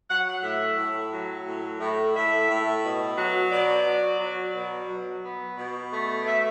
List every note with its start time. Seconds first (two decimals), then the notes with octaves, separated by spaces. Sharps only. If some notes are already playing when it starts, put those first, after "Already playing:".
0.08 F#3 F#5
0.42 A2 E5
0.77 A2
1.11 F#3
1.45 A2
1.80 A2
2.15 A2 E5
2.49 A2
2.82 B2
3.17 F#3
3.51 B2 D5
3.85 F#3
4.20 F#3
4.53 B2
4.88 F#3
5.23 B3
5.57 B2
5.91 A3
6.25 A3 E5